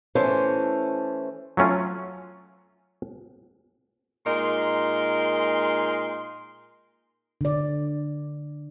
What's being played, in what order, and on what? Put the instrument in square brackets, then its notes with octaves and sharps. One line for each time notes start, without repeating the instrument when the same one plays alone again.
[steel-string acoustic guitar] E3 A3 C#4 C5
[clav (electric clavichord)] F#3 A3 C#4 F4
[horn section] A#2 G#3 D#4 A#4 C6
[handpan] D3 D5